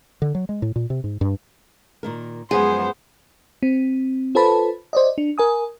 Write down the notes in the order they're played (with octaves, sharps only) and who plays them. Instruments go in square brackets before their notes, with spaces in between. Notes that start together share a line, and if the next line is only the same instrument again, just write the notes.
[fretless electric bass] D3
F#3
G#3
A2
A#2
C3
G#2
G2
[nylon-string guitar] A#2 D#3 A#4
[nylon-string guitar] F#2 F3 G#3 [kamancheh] B3 [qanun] G#4 [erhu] C5
[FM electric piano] C4
F4 A4 B4 C5 A5 B5
C5 D5 D#5
D4
A#4 G#5 D#6